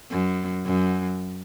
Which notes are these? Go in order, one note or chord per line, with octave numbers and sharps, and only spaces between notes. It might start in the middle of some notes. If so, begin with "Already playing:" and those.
F#2
F#2